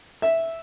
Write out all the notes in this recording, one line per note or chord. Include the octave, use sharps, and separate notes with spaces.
E5